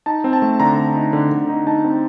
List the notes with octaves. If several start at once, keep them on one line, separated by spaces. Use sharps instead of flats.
D#4 A5
C4
A5
A3
D3 A#5
C4
D#4
D3
D3
D#4
D#4 A5
C4